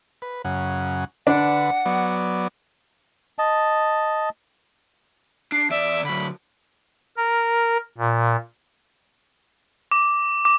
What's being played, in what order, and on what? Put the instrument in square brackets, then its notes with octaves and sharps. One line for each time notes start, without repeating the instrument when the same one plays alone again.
[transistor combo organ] B4
F#2 C#3 F#5
[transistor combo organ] D3 B4 [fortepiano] D4 [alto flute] F#5
[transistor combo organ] F#3 B3 D5
[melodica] D#5 A5
[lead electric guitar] D4 [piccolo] C7
[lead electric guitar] E2 D5 [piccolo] E5
[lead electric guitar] D3 F#3 [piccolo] B5
[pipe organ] A#4
A#2
[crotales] D6
D6